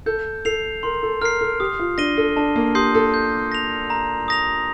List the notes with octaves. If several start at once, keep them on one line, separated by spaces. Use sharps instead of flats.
A4 G6
A4 C7 F7
A#4 C6
A4
A#4 F6 C7
A4
G4 D#6
F4
D4 A#6 D#7 G7
A4
D4 A5
A#3
G4 C6 D#6 G6 C7
A4
G6
A#6 F7
A#5
D#6 A#6 F7